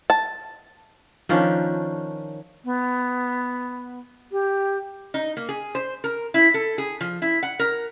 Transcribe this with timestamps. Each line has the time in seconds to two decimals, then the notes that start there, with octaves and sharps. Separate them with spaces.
0.10 A5
1.29 D#3 F3 C#4 D4
2.65 B3
4.32 G4
5.14 D#4
5.37 A#3
5.49 G#4
5.75 C5
6.04 A#4
6.34 E4
6.54 A4
6.78 G#4
7.01 F3
7.22 E4
7.43 F#5
7.59 A#4